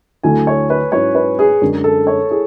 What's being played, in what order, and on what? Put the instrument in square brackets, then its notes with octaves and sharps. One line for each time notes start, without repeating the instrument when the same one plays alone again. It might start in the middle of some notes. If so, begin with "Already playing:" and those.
[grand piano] D2 D3 F#3 A3 E4 [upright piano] G#5
[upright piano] C#5
B4
[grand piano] G#2 F#3 C#4 E4 [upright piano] C#5
[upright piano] B4
G#4
[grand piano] F#2 D3 G#3 D4
[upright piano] A4
C#5
[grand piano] E4 [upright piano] G#4